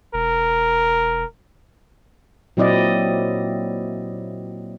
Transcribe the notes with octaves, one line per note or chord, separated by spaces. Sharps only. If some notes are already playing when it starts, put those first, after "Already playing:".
E1 A#4
A#2 F#3 C4 E4 D5 D#5